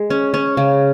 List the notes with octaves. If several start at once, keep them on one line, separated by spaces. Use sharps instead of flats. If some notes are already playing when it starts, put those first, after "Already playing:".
Already playing: G#3
C#4
C#4
C#3